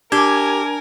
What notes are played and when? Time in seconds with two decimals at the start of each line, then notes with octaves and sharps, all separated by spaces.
0.12 D4 G4 A#4 G#5 G#6